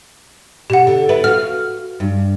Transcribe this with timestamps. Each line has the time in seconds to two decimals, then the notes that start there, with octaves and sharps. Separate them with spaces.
0.70 B2 G4 F#5
0.87 D3
1.09 B3 E4 B4
1.24 F#4 F5 F6
2.00 G2